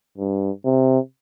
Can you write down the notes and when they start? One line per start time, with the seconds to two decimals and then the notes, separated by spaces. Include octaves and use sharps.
0.18 G2
0.65 C3